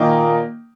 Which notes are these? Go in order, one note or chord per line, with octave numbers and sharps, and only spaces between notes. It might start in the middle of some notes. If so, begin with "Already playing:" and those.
Already playing: A#2 D#3 A#3 D#4